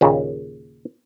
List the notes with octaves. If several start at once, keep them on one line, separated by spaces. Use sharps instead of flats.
D#2 A#2 C#3